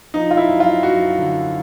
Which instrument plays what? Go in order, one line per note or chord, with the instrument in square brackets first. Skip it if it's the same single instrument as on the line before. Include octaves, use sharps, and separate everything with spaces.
[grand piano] F3 D#4
F4
E4
F#2
F4
F#2 F#4
D3